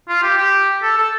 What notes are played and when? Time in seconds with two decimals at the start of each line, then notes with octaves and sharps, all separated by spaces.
0.09 F4
0.23 G4
0.38 G4
0.82 A4
0.98 A4